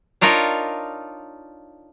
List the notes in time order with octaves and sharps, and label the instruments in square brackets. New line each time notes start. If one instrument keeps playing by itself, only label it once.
[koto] D4 D#4 F4 A#4 C#5 D5